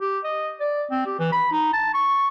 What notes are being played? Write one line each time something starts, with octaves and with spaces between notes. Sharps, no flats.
G4
D#5
D5
C4
G4
E3
B5
D#4
A5
C#6